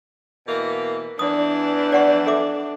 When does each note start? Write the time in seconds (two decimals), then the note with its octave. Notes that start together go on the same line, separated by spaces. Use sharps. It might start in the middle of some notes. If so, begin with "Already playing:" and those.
0.46 B2 E3 A#3
1.19 E2 E3 D4 D5 D#6
1.92 D5 F#5 C#6
2.27 A4 E5 D6